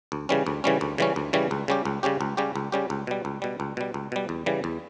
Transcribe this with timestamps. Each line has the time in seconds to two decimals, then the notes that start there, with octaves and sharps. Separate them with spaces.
0.12 D2
0.29 C#3 E3 G3 C#4
0.47 D2
0.64 C#3 E3 G3 C#4
0.81 D2
0.98 C#3 E3 G3 C#4
1.16 D2
1.33 C#3 E3 G3 C#4
1.51 C#2
1.68 C#3 G3 C#4 G4
1.85 C#2
2.03 C#3 G3 C#4 G4
2.21 C#2
2.37 C#3 G3 C#4 G4
2.56 C#2
2.72 C#3 G3 C#4 G4
2.90 C#2
3.07 B2 G3
3.25 C#2
3.42 B2 G3
3.60 C#2
3.77 B2 G3
3.94 C#2
4.12 B2 G3
4.29 E2
4.46 C#3 E3 G3
4.64 E2